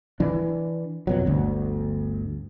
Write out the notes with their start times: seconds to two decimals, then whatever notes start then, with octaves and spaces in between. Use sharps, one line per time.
0.20 E3 D4
1.07 F2 B2 F#3
1.26 G1 D2